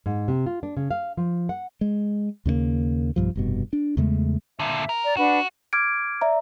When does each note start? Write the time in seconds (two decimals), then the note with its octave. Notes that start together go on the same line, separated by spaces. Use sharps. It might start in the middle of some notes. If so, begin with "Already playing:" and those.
0.06 G#2
0.28 C3
0.46 F4
0.63 D4
0.77 C#3
0.91 F5
1.17 F3
1.49 F#5
1.81 G#3
2.45 D#2 C#3 G#3 A#3
3.16 B1 G2 F3
3.36 F1 G2 B2
3.73 D4
3.97 E2 C#3 G#3 A3
4.59 A#2 D3 E5
4.89 A#4
5.05 D5
5.17 D4 F#4 B4 F#5
5.73 D6 F6 G#6 D7
6.21 D5 E5 A#5